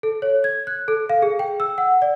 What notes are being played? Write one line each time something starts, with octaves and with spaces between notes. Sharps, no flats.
A4
C#5
G#6
F#6
A4
F5
G#4
G5
E6
F#5
D5